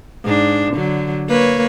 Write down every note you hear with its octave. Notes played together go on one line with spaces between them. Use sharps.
G#2 D4
D3 F#3
A#3 B4 C#5